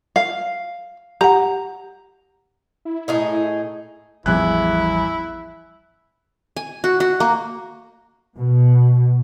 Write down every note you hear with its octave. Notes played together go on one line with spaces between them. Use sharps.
F5
G4 F#5 A#5
E4
A2 D#4 G#4
A1 E2 F3 G3 E4 G#5 F#6
G#5
F#4
F#4
A#3
B2